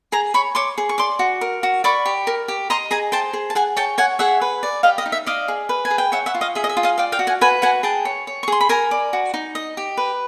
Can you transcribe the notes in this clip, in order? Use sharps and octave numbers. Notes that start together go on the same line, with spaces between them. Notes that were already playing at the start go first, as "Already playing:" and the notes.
G#4 G#5 A#5
C#5 B5 C#6
C#5 C6 D6
G#4
C#6
D5 C6 D6
F#4
A#4
F#4
D5 B5 C#6
G4
A#4
G4
D#5 A#5 C6
G#4 G#5 A#5
C5 G5 A5
G#4
A5
G#4 F#5 G#5
C#5 G5 A5
C#5 F#5 G#5
G#4 E5 F#5
B4
D5
G4 D#5 F5
D#5
D#4
E5
D5 D#5 F5
G#4
B4
G#5
G#4
G5
C#5 E5 F#5
E5 F#5
F4
D#5 F5
G#4 E5
D#5
E5
F4
D#5 F5
D5 F5 G5
F5 G5
F#4
F#5 G#5
B4 F#5 G#5
F#4 F#5 G#5
G#4 G5 A5
C#5
C#5
C#6
G#4 C6
B5
A#4 G#5 A#5
D5
F#4
D#4
D#5
G4
B4